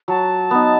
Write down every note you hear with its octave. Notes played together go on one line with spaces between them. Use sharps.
F#3 A5
B3 D#4